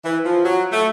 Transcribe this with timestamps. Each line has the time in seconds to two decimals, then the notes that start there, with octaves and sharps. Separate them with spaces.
0.04 E3
0.25 F3
0.44 F#3
0.71 A3